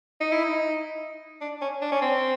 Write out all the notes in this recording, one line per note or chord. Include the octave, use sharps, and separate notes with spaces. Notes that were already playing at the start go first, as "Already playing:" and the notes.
D#4
E4
D#4
D4
C#4
D4
C#4
C4